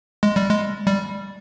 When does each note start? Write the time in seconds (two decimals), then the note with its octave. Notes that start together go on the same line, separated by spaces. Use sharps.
0.23 G#3
0.36 G3
0.50 G#3
0.87 G3